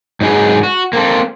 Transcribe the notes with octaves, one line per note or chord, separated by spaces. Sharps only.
G#2 F#3 D#4 G#4 B4
F#4
A#3 C4 A4